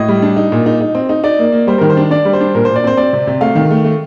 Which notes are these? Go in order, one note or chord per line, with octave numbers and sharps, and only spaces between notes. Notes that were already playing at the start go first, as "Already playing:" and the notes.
Already playing: A2 D#5
G3
D4
D#4
A#2
D#4
D#4
C4
D#4
D#4 D5
A#3
A#3
G3 C5
D#3 A#4
C5
D4
D4 D5
G3
C5
D4
A#2 A#4
A#2 C5
D5
C4 C5
C4 D5
C3
C3
A3 F5
D#3
A3
A3